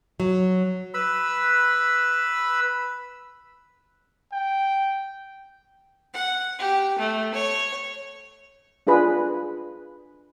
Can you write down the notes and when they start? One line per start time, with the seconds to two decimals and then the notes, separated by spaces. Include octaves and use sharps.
0.20 F#3
0.94 B4 B5 E6
4.32 G5
6.14 F#5
6.59 G4
6.98 A3
7.34 C#5
8.87 D4 F4 G#4 B4 B5